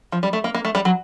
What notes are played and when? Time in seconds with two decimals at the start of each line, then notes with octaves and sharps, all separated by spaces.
0.12 F3
0.23 G3
0.33 A3
0.44 A#3
0.54 A#3
0.65 A3
0.75 G3
0.85 F#3